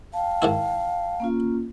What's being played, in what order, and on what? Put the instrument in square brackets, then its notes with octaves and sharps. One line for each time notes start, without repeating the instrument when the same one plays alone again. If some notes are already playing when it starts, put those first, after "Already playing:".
[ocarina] F5 [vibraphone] G5 A5
[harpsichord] G#2 D#3 E4
[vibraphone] A#3 C#4 F4